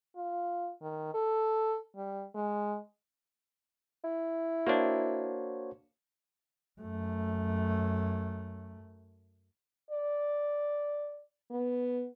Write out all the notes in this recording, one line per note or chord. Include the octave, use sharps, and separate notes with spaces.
F4
D#3
A4
G3
G#3
E4
A#3 D4 F#4 C5 C#5
F#2 A3
D5
B3